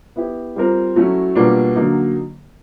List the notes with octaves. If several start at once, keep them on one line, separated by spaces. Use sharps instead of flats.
B3 E4 G4
G3 C4 F4 A#4
F#3 A3 C#4 E4
B2 G3 A#3 D4 F4
D3 F#3 A#3 D#4